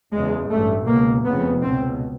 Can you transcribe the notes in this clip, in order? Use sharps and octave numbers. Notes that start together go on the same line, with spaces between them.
F#1 E2 C#3 G#3
A1 G2 A3
C#2 B2 A#3
F1 F2 C#3 B3
C#2 B2 C4